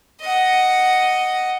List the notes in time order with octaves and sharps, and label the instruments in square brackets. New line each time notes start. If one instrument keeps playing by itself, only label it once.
[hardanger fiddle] D#5 F#5